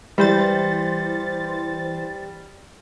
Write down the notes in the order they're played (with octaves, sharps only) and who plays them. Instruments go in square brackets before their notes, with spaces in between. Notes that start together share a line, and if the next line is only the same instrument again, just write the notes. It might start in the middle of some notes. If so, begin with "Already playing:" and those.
[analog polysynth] E3 C5 A6 [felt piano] G3